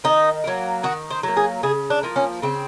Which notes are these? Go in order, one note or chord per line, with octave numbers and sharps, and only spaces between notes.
D#3 D#4
F#3 A#3
D#3 F#4
C5
F#3 A#3
G#4
C#3 G#4
D4
F3 A#3
C#4
C#3 C4